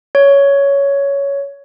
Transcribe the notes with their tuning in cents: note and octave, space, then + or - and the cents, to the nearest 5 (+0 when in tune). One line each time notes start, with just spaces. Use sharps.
C#5 +10